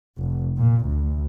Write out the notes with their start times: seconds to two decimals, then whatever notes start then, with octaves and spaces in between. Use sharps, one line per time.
0.16 F1
0.57 A#2
0.86 D2